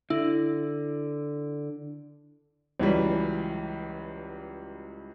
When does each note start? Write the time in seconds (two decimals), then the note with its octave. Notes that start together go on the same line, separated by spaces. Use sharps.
0.10 D3 E4
2.80 C#2 E3 F#3 G3